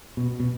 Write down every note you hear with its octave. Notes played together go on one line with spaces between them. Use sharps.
B2
B2